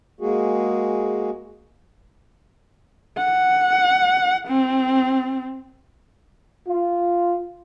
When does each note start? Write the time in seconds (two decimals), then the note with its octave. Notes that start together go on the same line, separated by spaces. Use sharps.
0.21 G#3 A#3 F#4 G#4
3.18 F#5
4.48 C4
6.67 F4